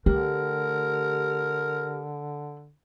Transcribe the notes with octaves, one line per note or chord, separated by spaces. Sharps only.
D3 A3 G4 A#4